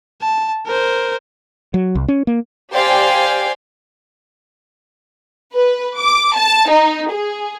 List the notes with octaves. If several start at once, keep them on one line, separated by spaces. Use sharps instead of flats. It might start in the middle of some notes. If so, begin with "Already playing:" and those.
A5
A#4 C5
F#3
C2
C#4
A#3
G4 C5 D5 F5 G5 G#5
B4
D6
A5
D#4
G#4